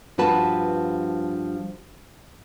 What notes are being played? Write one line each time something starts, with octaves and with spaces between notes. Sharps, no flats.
G2 F3 F#4 B4 A5